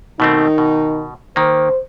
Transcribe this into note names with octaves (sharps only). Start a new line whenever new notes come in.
B2 D#3 A3 C4 D#4
B2
D#3 A#3 C5